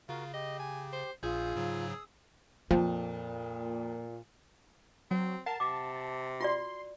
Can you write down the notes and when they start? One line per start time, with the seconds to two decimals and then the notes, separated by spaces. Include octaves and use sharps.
0.09 C#3 F4 F#4 A#4
0.34 G4 D#5
0.59 G#5
0.93 C5
1.23 A#1 A#2 F4 G#4 D#6 E6 G6
1.56 G#2 C#3 F#3
2.71 F2 A#2 F3 A#3
5.11 F#3 C4
5.46 A#4 F#5 A5
5.60 C3 D6
6.40 F4 F#4 D5 C6